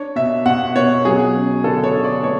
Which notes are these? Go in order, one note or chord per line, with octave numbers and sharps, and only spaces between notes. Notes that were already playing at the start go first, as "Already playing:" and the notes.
Already playing: D4 C#5
B2 E5
B2 F#5
B2 C#5
F#3 G#4
C#4
D3 A4
C#5
D3
D5
A3 C#5